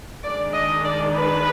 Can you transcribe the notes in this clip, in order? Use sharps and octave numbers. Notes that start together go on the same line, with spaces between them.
D#3 G#3 D4 D5
D#5
D5
B4